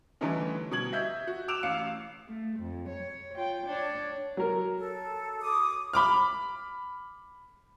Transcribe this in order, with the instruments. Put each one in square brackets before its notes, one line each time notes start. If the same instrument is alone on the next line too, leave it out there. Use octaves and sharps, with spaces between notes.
[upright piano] D3 E3 G3 A3 C#4 D#4
B2 G3 G#6 F#7
D#5 E5 G6 G#6
F#4
D6 E6 F#6 D7 E7 F7
A1 F5 C#7 E7
[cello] A3
F2
C#5
F4 G5
D4 C#5
[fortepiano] F#3 A#4
[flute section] A4
D6 D#6
[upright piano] B5 D6 F6